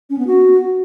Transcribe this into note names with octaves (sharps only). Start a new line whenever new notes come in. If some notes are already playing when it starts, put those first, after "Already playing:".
C#4
B3
F#4